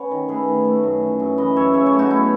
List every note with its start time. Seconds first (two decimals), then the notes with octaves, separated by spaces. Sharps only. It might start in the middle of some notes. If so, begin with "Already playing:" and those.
Already playing: C#4 B4 C#5 F#5
0.11 D#3
0.29 A3 G#4 B4
0.48 D#3
0.65 A3
0.84 F#2
1.02 E3
1.20 F#2
1.38 E3 B4 D#5
1.56 F#2 C#5 E5
1.74 C#3 C#5 E5
1.86 C#5 E5
1.93 A3
1.99 D#4 F#4
2.10 B3 E4